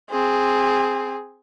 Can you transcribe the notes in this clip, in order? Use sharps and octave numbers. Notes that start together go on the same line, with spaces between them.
C4 G#4